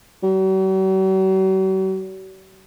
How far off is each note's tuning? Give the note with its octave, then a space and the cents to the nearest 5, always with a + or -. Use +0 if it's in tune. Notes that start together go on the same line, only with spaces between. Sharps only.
F#3 +45